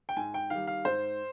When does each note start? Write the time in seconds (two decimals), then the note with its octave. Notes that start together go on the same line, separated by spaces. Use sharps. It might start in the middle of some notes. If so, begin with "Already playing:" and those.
0.09 G5
0.17 G#2 G#5
0.34 G5
0.50 D#3 G3 F5
0.67 F5
0.85 G#2 C5